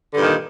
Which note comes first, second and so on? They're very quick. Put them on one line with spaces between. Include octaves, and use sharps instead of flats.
D3 G2 A#2 D#3